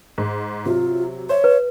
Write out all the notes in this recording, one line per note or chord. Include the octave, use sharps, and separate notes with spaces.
G#2
C3 F#3 F4
C5 C#5 E5
B4